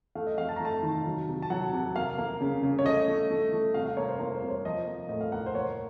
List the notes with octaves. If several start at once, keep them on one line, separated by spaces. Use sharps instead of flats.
A3 F5
D#5
F2 F5
A5
A#5
A3 A5
D#3
F#3
C3
A5
F#3 F#5
C3
A#3 F5
A#3
C#3
C#3
C#5
A3 D#5
A3
A3
A3
C3 F5
F5
A#3 C#5
C5
A#3 C5
C5
C3
C#5
F3 D#5
A#3
A2 D#5
F5
A#3 F#5
C5
A#3 C#5